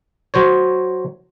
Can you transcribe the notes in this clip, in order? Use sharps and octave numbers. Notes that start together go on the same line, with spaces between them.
F#3 C5 C#5